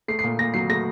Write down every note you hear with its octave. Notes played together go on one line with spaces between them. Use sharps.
A3 C7
C7
A#2
A#2 A#6
F#3 C7
A3 A#6